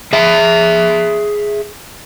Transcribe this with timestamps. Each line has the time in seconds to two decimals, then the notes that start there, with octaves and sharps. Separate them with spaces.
0.13 G#4 E5